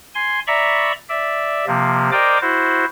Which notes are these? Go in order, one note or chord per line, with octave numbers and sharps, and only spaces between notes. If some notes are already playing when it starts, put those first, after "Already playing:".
G#5 C6
D5 E5 A#5 B5 C#6
D5 E5
C3 F3 A#3
A#4 C5 D5 D#5 G5 D6
E4 F#4 C5